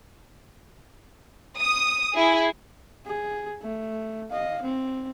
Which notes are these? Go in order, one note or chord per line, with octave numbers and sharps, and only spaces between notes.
D#6
E4 G#4
G#4
A3
D#5 F5
C4